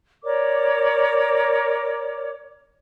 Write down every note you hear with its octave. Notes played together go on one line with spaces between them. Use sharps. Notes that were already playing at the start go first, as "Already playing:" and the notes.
A#4 C#5 D5 D6